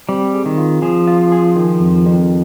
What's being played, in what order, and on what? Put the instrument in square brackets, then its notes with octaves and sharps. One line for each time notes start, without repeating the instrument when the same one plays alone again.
[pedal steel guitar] G3 [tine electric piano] C4
[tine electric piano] G#4
[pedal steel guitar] D#3
[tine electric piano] F4
[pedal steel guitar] F3 [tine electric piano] G#4
[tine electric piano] F4
G#4
D#3
F2
F2